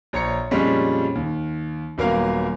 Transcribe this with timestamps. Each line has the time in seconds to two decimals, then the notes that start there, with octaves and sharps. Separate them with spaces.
0.13 A#1 C#5 A#5 C#7
0.51 F2 A#2 G3 G#3 C#4
1.15 D#2
1.98 D#1 F#3 A#3 B3 A#4 F5